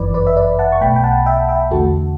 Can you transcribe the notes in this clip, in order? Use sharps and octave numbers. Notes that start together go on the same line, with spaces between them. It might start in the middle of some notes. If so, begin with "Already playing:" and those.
Already playing: G1 F#2 E3 B4 D5
B4 D5
E5
B4 D5
F#5 A5
C#6
B1 B2 A3 G5 B5
G5
F#5 A5
E5 G5
E5 G5
E2 D3 A3 F#4 A4